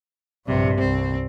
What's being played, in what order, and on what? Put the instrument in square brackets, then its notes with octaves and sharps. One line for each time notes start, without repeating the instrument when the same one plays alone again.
[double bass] A#1 G2 [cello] C3
[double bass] C2 [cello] C4